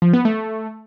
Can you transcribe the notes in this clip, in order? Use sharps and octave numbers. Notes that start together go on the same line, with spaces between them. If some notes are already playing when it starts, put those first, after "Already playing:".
F3
B3
A3